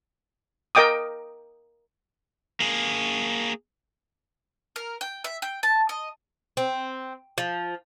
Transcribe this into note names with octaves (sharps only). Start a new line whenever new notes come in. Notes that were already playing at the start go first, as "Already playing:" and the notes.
A#4 D#5 G5 D6 D#6
A#3 G#4
A#4
G5
E5
G5
A5
D#5
C4
F3